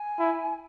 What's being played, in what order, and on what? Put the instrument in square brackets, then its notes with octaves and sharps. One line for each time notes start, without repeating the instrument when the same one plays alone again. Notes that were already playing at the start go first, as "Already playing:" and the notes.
Already playing: [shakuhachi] G#5
[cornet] E4